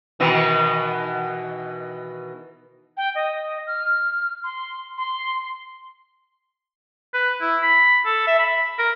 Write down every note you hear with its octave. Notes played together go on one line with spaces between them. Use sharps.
B2 D#3 E3
G5
D#5
F6
C6
C6
B4
E4
B5
A4
E5
B5
A#4